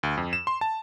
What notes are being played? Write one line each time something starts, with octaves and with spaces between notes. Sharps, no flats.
D2
F2
E7
C6
A5